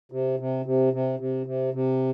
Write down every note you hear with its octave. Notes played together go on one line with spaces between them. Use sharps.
C3
C3
C3
C3
C3
C3
C3